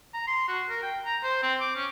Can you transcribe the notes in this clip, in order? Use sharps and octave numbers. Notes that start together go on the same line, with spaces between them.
A#5
C6
F#4
A#4
G5
A#5
C5
C4
D6
C#4